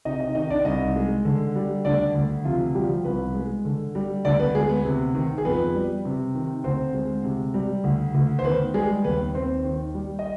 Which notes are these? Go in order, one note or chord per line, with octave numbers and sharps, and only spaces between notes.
C3 D#4 D#5
D#4 D#5
D#3 D#4 D#5
D4 D5
C2 D#4 D#5
G#3
D3
G3
D2 D4 D5
D2
C3 F3 F4
F3 G3 G4
C2 B3 B4
G#3
D3
G3
D2 D4 D5
B3 B4
D2 G#3 G#4
B3 B4
C3
D#3
G#4
F2 B3 B4
G3
C3
D#3
D2 C4 C5
G#3
C3
G3
D2
D2
C5
D#3 B3 B4
G3 G#3 G#4
D#2 B3 B4
D#2 C4 C5
D#3
G3
D#5